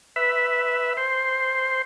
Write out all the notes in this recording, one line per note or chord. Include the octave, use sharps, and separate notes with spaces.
B4 E5
C5